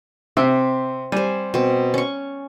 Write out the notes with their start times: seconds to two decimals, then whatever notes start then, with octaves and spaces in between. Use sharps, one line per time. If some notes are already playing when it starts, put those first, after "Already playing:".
0.37 C3 C4 E5
1.12 G3 C5 G#5
1.54 B2 C4
1.94 C#4 C#6